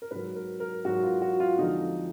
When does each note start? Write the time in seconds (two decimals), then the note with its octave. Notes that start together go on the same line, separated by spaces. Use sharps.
0.02 A#4
0.11 G#2 F#3 B4
0.36 A#4
0.60 A#4
0.85 G#2 F#3 F#4
1.03 F4
1.22 F#4
1.40 F4
1.59 F2 D3 F3 G#3 D#4